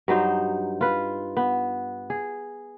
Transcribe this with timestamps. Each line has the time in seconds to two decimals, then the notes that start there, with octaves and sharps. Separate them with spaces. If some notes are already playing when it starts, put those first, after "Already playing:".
0.08 G2 F#3 D#4 C5
0.81 F4 B4
1.37 B3
2.10 G#4